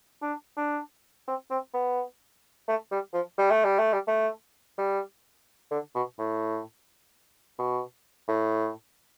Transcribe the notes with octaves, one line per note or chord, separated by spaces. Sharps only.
D4
D4
C4
C4
B3
A3
G3
F3
G3
A3
G3
A3
G3
A3
G3
D3
B2
A2
B2
A2